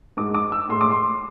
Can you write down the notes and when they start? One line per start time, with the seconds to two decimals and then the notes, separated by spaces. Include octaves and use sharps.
0.17 G#2 G#3 D6
0.34 D6
0.52 E6
0.69 A2 G#3 C6
0.81 D6
0.91 C6